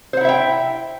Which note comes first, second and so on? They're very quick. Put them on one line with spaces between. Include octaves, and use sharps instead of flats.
C5 F#5 E4 E5 G5